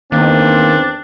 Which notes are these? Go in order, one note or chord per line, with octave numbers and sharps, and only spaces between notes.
E2 D#3 E3 A#3 C4 D4